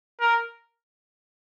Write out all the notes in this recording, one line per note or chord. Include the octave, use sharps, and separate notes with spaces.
A#4